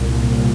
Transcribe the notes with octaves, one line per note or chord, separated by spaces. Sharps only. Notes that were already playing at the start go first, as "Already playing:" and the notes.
Already playing: C2 A#2